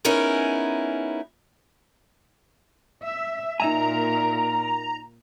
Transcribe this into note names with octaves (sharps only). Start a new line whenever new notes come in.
B3 C#4 D#4 E4 G#4 A#4
E5
A#2 D#4 A#4 E5 G#5 A#5